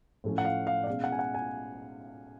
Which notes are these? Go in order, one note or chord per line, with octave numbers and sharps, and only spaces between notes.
A2 F3 A3 C#4
F#5
F5
F5
D5
B2 G#3 C#4 F5
F#5
G#5
F#5
G#5